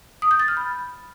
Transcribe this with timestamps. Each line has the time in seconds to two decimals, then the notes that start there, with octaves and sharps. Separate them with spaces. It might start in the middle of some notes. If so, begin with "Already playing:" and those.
0.22 D#6
0.31 G6
0.40 A6
0.48 F6
0.57 B5